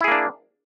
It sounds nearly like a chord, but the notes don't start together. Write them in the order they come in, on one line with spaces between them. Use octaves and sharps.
E4 G#4 A#3 D4